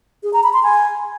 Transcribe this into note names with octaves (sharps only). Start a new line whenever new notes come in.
G#4
A#5
B5
C6
G#5